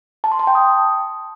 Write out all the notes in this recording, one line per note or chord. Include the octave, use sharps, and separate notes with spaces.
A5
C6
A5
G5
D#6